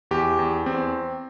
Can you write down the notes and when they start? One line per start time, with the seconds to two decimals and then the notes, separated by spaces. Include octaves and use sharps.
0.11 E2 G4
0.39 E2
0.66 E2 C4